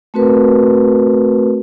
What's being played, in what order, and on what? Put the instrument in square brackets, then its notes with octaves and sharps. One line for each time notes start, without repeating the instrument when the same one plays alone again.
[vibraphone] A3 C4 F#4 A#4 B4